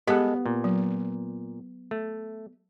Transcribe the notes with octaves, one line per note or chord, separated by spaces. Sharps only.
G#3 B3 G4 A4
A#2
F#3
A3